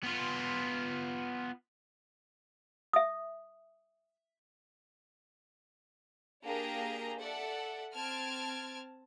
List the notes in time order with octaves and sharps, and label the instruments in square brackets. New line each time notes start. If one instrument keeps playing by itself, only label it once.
[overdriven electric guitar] B3 F4
[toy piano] E5 D#6
[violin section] A#3 D4 G4 G#4 A#4 A#5
A4 D5 E5 F#5
C4 A5 F6 G#6 D7